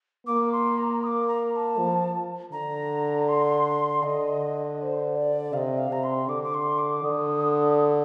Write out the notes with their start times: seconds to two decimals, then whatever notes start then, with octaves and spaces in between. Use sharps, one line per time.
0.26 A#3 D6
0.52 C6
0.78 A#5
1.03 D#6
1.06 D6
1.28 A#5
1.52 A#5
1.56 A5
1.78 F3
2.52 D3 A#5
3.28 C6
4.03 D3 D#5
4.78 D5
4.82 C5
5.15 D5
5.53 C3 F5
5.57 D#5
5.78 F5
5.91 C3 A#5
6.03 C6
6.28 D3 D6
6.43 D6
6.54 C6
6.78 D6
7.03 D3 D#6